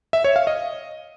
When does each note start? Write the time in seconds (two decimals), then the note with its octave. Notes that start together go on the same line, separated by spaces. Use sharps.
0.13 E5
0.24 C#5
0.36 F5
0.47 D#5